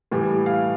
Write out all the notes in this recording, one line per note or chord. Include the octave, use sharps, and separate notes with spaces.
A2 E3 G3
F5